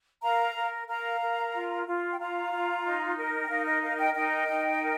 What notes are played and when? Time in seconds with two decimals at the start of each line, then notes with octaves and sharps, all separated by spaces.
0.22 A#4 F5 A#5
0.55 A#4
0.87 A#4 F5 A#5
1.21 A#4
1.53 F4
1.86 F4
2.12 G5
2.19 F4 F5 A#5
2.51 F4
2.84 D#4
3.16 A#4
3.44 G5
3.49 D#4 F5
3.66 D#5
3.82 A#4 F5
3.98 D#5 G5
4.14 D#4 D#5 G5
4.48 D#4
4.80 A#4